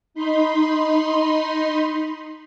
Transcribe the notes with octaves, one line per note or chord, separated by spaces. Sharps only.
D#4 B5 C6